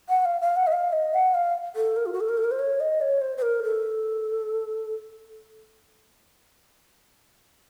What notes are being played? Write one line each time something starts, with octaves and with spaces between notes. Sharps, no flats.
F#5
F5
F5
F#5
D#5
F5
D#5
F#5
F5
A4
A#4
F4
F#4
A4
A#4
A4
A#4
C5
C#5
D#5
C#5
C5
C5
A#4
A4